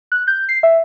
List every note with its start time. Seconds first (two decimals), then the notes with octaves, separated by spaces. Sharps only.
0.12 F#6
0.27 G6
0.49 C7
0.63 E5